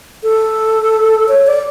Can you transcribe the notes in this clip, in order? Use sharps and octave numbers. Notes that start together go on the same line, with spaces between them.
A4
C#5
D5